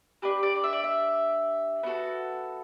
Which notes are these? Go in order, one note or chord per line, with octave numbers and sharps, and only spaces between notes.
D4 G4 B4
D5
D5
E5
D5
E5
B3 F#4 A4